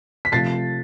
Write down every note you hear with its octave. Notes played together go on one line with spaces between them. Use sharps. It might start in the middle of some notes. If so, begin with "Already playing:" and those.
B6
C3 F3 A3 A6 C7